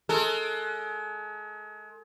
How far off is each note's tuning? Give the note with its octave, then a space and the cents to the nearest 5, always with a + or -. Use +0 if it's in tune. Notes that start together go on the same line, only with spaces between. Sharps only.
G#3 +35 A4 +35